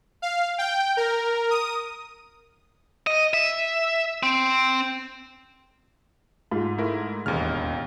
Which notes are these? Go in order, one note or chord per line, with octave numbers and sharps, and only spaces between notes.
F5
G5
A#4
D#6
D#5
E5
C4
G#2 F4
A3 E4 A#4
E1 A1 D#2 F6